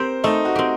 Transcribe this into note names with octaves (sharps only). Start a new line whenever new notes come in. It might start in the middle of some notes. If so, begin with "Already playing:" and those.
Already playing: C4 G4 A#4 C5
A3 D#4
F#4
C4 G4